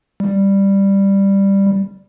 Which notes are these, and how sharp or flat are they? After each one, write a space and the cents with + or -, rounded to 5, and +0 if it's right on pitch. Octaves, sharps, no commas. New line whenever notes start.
G3 +5